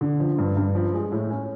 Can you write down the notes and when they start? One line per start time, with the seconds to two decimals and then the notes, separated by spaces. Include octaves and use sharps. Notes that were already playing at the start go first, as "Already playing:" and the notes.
0.01 D3
0.20 F3
0.38 G2
0.57 G2
0.75 F3
0.94 G#3
1.12 A2
1.31 C#4